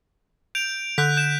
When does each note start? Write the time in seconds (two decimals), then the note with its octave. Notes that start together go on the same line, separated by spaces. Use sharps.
0.55 G6 D7 F7
0.98 D3 F#6 G6 B6
1.17 G6 E7